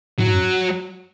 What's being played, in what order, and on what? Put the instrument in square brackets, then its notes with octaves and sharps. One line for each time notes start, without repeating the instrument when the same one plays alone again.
[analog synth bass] A2 [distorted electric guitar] F#3
[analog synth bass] G#2
F#2